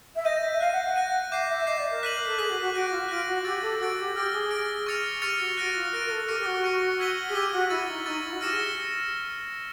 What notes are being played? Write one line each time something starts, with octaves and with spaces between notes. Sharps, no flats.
E5
D#5 G6 A#6 D#7
E5
F5 F#6 A#6 D#7
F#5
F#5
F#6 A#6 D#7
E5 D6 G6 C7
E5
D#5 D6 G6 C7
D5
A#4
F#6 B6 D#7 F#7
A4
G#4 F#6 B6 D#7 F#7
F#4
F#4
F#4 F#6 A#6 D7
F4
F4 F#6 A#6 D7
F#4
G4 E6 A6 D7
A4
F#4 E6 A6 D7
G4
G4 F6 A#6 D7
G#4
F6 A#6 D7
C#6 F6 A6 C#7 F7
G4 C#6 F6 A6 C#7 F7
F#4
F#4 F#6 A#6 D7
F4
A#4 F#6 A#6 D7
A#4
A4
G4 C#6 F6 A#6 C#7
G4
F#4
C#6 F6 A#6 C#7
E6 G#6 B6 D#7 G7
G#4
G4 E6 G#6 B6 D#7 G7
F#4
E4 C#6 E6 A6
D#4
D#4 C#6 E6 A6
E4
F#4
G4 F6 A#6 C#7 E7
G#4